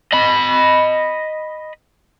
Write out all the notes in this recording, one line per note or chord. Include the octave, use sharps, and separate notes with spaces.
D#5 B5